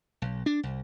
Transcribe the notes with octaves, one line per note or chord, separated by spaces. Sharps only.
B1
D4
C2